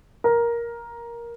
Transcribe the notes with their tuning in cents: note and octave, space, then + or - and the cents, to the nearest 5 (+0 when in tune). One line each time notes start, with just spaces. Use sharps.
A#4 +10